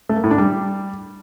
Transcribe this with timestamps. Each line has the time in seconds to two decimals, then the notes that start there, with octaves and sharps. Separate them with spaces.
0.09 A3
0.17 A#3
0.24 A2
0.31 D4
0.38 G3